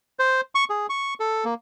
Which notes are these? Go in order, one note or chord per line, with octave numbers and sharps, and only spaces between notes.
C5
C#6
G#4
C#6
A4
A#3